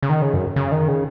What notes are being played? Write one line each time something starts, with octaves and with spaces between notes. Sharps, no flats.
C#3
D#3
C#3
F#2
C#3
D#3
C#3